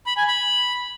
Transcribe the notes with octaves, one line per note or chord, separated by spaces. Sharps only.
B5
G#5
B5